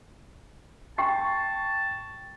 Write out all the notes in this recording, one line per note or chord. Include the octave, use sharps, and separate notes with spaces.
G5 A5 C#6 C7